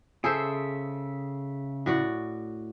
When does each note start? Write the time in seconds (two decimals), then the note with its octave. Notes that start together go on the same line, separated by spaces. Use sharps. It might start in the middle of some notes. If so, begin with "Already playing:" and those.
0.24 C#3 G#4 A4 C5 E5
1.86 A2 F#4 D5